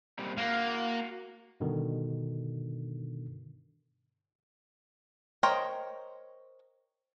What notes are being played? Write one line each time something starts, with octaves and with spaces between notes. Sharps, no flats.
A#2 G3 C4
A#3 F#4 F5
G2 B2 D3 D#3
A#4 C5 C#5 D#5 G5